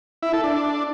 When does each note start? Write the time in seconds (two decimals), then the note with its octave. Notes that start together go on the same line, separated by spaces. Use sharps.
0.23 E4
0.33 A4
0.44 D4